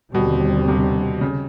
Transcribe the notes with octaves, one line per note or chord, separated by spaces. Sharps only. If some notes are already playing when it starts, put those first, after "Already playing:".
D#2 B2 D3 G3 C4
C3
C#3